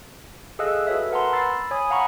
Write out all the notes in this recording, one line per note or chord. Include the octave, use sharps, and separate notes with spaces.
G#4 A4 D#5 F5 E6 F#6
F#4 A4 B4 C#5 E5
A#4 B4 F#5 A5 A#5 C6
B5 E6 A6 C7
C#5 G#5 B5 D#6
F5 F#5 A#5 B5 C#6